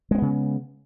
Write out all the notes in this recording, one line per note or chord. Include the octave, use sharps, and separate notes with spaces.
C#3 G#3 B3 C4